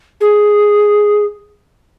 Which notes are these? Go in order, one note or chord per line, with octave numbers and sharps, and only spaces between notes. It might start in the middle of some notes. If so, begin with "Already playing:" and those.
G#4